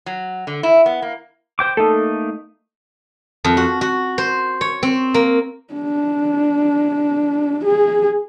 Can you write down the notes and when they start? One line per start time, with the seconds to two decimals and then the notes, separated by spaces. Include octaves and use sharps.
0.06 F#3
0.47 D3
0.63 E4
0.86 B3
1.02 A#3
1.59 C5 G5 D6
1.77 A3 A#3 D#4 A4
3.44 F2
3.57 F#4
3.81 F#4
4.18 C5
4.61 C#5
4.83 C4
5.14 A#3
5.74 D4
7.65 G#4